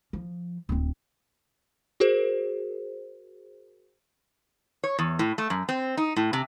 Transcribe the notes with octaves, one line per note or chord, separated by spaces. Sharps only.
F3
D1 C4
F#4 G#4 A#4 C5
C#5
E2
A2
A3
F#2
C4
D#4
A2
C3